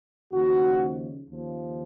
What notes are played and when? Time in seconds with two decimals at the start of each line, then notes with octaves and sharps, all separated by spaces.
0.32 D#2 C#3 F3 F#4
1.29 D#2 C#3 F3